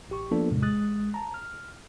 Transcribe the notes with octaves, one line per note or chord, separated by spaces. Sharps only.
A1 G4 C#6
F3 A#3 B3 D4 F4 A4
E2 A2 C3 G#3
A1 G#3 D#6 F#6 A6
A5 A#5
F6